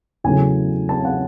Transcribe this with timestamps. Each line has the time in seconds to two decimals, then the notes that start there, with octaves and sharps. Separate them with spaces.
0.24 E2 C#3 F#3 A3 G#5
0.89 A5
1.05 F#5